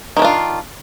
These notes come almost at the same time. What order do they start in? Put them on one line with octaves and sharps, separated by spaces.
D#3 C#4 D4 F4